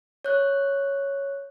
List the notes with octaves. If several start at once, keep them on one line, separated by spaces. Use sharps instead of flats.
C#5 F#6